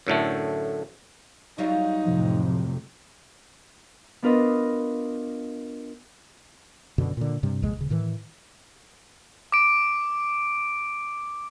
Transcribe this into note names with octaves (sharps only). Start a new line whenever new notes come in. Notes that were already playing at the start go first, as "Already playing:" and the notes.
F#2 A2 D3 A3
F#3 G3 D#4 F4
F2 A2 C3 F3
B3 D4 F4 A#4 B4 D#5
F#2 B2 D3
A#2 D3
G2 C3 G3
A#1 D#2 C3 G#3
D#1 C#3
A2 D#3 E3
D6 D7